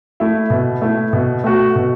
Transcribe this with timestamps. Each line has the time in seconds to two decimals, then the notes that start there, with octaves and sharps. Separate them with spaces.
0.20 A3 E4
0.50 B2
0.82 A3 E4
1.13 B2
1.44 A3 F#4
1.75 B2